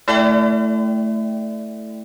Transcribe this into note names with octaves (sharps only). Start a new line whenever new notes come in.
A3 E4 A4 D5 E5 G5